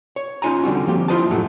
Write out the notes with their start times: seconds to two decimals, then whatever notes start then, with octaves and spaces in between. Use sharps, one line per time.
0.16 C#5
0.42 C#4 D#4 F4 G#5 A#5
0.64 D3 G3 C4 F#4
0.87 F3 A#3 G4
1.08 E4 F4 B4 C5 D#5 A5
1.30 F#2 A2 F#3 A3